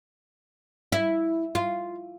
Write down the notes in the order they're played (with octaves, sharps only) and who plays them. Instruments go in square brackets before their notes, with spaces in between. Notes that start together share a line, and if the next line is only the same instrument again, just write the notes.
[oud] E4
F4